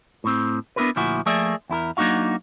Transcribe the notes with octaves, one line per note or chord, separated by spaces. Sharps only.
A2 C4
B3 D4 E4 F#4 A#4 B4
D2 A#2 F3 E4 F#4 G#5
F3 A3 A#3 G#4 D5 E5
E2 E4 A4 A#4
F#3 A#3 D4 D#4 F#4 F5